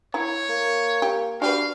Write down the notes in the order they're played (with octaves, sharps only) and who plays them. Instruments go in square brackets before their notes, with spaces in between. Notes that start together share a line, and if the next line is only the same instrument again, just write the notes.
[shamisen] E4 A#5 [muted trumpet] C#5
[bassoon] A#3
[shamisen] G4
[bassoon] D4 [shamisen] F#4 G4 B4 [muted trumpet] F5